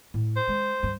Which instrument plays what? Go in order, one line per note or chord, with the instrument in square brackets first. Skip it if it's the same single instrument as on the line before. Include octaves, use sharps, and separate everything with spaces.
[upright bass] A2
[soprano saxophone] C5
[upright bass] G#3
G2